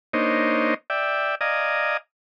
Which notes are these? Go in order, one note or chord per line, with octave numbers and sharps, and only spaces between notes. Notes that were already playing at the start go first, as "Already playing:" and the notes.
A#3 D4 D#4 C5 C#5 D#5
D5 E5 G5
D5 D#5 F5 G#5 A#5 D#6